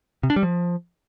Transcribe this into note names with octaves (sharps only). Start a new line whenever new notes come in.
C3
D4
G3
F3